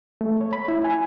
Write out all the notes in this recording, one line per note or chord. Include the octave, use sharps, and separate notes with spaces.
A3
C#5
B5
E4
G#5